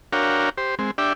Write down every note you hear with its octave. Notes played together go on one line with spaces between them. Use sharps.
D4 F#4 A#4 C#5 F5 G5
G4 C5
G#3 C4
D4 G4 D5 E5 G5